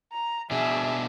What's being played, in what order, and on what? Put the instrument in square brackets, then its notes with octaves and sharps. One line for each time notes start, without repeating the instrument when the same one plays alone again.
[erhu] A#5
[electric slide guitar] B2 D4 [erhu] G#4 [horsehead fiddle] E5